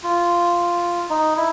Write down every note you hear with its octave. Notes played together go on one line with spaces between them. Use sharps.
F4
D#4
E4